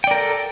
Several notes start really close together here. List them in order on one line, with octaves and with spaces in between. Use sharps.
G5 D5 A#4 A4